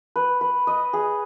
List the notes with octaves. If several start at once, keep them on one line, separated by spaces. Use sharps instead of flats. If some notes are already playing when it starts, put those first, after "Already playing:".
B4
B4
D#5
G#4